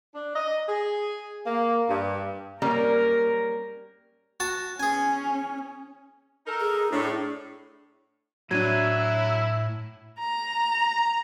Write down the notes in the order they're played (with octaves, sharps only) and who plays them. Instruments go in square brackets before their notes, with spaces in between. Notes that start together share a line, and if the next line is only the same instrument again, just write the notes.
[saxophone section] D4
D#5
G#4
A#3
G2
[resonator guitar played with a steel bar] G3 A#3 C#4 [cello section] A#4
[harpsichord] F#4 A5
[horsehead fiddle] C#4 [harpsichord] G#4 G#5
[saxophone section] D#4 A4 A#4
[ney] G#4
[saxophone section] A2 [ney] D4
[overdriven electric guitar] A2 [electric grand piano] F#3 D4 [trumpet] E4 [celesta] G#6 D#7
[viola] A#5